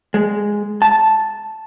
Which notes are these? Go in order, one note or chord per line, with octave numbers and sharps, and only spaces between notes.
G#3
A5